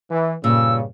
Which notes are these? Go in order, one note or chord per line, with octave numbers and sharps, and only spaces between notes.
E3
G2 A#2 C#3 E6